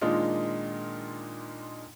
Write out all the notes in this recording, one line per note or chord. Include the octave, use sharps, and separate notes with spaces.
A#2 D#3 G#3 D4 D#4 F4